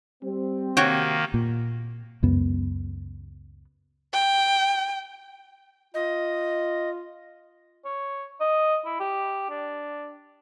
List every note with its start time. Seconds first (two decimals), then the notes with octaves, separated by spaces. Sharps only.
0.23 G3 C4
0.77 C3 D#3 A#3 F#4 C#5 G5
1.34 A#2
2.23 C#2 F#2 B3
4.13 G5
5.94 F4 D#5
7.85 C#5
8.41 D#5
8.85 E4
9.00 G4
9.50 D4